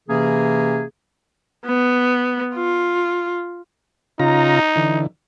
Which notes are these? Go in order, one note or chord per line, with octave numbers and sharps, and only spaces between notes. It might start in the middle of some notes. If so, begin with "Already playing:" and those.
C3 E3 A#3 C#4 G#4
B3
F4
C#3 D#4 F4 A#5
D3 E3